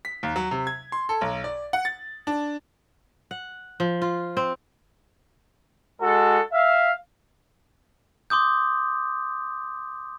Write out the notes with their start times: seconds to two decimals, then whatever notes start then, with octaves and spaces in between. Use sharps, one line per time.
0.05 B6
0.23 D#2
0.36 F#3
0.51 C3
0.67 G#6
0.92 C6
1.09 A4
1.21 B1
1.44 D5
1.73 F#5
1.85 A6
2.27 D4
3.31 F#5
3.80 F3
4.02 F4
4.37 C4
6.01 G#3 F#4 A4
6.52 E5 F5
8.30 C6 D6 D#6 G6